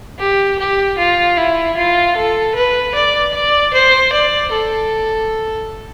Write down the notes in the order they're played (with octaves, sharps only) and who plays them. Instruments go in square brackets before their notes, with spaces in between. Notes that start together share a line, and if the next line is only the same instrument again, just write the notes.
[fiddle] G4
G4
F4
E4
F4
A4
B4
D5
D5
C5
D5
A4